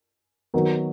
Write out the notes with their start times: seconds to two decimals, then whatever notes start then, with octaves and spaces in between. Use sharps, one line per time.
0.54 D#3 F#3 B3 D#4